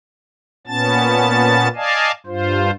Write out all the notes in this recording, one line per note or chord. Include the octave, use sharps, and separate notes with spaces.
A#2 B3 C#4 A5 A6
D5 D#5 F5 G#5 A5
G2 F4 C5